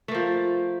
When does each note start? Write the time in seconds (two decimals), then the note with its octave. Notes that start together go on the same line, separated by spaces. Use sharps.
0.08 A3
0.11 A#3
0.15 F3